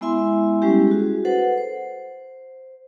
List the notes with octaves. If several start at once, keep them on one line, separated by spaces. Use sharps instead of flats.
G#3 B3 E4 E5 G#5 C6
G3 G#3 C#4 E4 G4
F#4 G#4
A4 B4 C5 F#5
C5